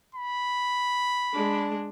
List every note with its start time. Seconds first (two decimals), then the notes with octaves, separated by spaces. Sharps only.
0.15 B5
1.34 G#3 D4